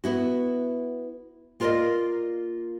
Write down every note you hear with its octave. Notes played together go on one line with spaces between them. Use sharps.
B3 E4 F#4
A#3 F4 A#4 C5 D5 D#5